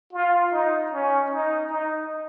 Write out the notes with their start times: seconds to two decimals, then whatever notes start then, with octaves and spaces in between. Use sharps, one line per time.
0.13 F4
0.52 D#4
0.92 C#4
1.30 D#4
1.70 D#4